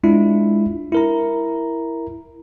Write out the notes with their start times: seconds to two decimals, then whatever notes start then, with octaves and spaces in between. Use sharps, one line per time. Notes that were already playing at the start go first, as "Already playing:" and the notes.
0.03 G#3 D4 E4 F4
0.92 E4 A#4 A#5